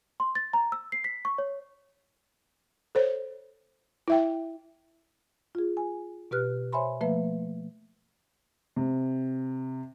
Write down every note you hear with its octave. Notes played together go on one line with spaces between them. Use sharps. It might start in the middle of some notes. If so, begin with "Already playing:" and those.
C6
A6
A#5
E6
C7
B6
C#6
C#5
A4 C5 C#5
E4 E5 G5
F4 G#4
G#5
B2 G4 B4 F6 F#6
C5 C#5 E5 G#5 B5 C6
F3 A3 A#3 B4 E5
C3